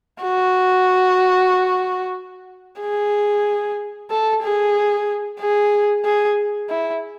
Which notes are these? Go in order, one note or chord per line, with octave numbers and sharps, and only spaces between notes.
F#4
G#4
A4
G#4
G#4
G#4
E4